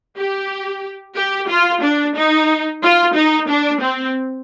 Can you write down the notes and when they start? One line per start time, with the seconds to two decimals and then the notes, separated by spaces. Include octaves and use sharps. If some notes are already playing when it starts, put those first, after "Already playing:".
0.16 G4
1.16 G4
1.48 F4
1.82 D4
2.15 D#4
2.82 F4
3.15 D#4
3.48 D4
3.82 C4